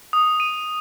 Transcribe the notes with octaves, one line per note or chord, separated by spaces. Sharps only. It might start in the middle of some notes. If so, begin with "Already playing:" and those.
D#6
D#7